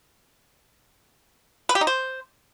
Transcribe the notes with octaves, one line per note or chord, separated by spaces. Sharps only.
B4
G4
D#4
C5